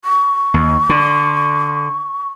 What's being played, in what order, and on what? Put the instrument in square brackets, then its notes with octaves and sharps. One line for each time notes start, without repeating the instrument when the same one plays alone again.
[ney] C#6
[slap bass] D#2
D3